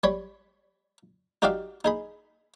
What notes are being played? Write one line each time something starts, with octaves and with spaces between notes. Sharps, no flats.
G3 C#5 B5
D#4 F#4 G4 D5 E5 F5
D#4 G#4 B5